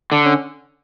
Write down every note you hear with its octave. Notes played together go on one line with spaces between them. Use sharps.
D3 D4
C#4